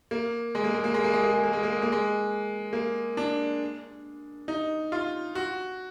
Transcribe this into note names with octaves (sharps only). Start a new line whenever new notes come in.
A#3
G#3
A#3
G#3
A#3
G#3
A#3
G#3
A#3
G#3
A#3
G#3
A#3
G#3
A#3
G#3
A#3
D4
D#4
F4
F#4